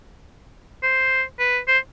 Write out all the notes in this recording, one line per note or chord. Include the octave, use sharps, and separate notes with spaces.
C5
B4
C5